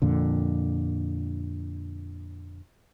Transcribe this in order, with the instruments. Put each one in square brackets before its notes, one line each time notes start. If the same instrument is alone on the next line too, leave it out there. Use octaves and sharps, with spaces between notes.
[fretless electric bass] F2 A#2 D3